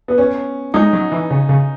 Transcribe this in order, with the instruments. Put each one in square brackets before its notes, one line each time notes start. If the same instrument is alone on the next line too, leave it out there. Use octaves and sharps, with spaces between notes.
[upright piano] B3
C#4
[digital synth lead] G#3 [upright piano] D#4
[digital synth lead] F#3
E3
C#3
C#3